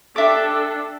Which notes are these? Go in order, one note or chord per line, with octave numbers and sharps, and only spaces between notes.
D4 G4 A4 E5 D6